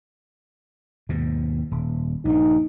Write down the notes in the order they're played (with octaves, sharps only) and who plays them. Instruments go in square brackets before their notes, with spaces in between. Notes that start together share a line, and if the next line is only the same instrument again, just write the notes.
[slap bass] D#2 G#2 B2
D#1
[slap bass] A#1 G2 [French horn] D#4